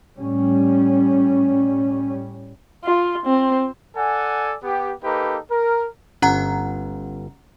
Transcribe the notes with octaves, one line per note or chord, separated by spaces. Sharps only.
A2 G3 C#4
F4
C4
A4 D5 F#5 G#5
B3 G4
A#3 D#4 G4 A4 B4
A#4
G1 C#4 F#5 A#5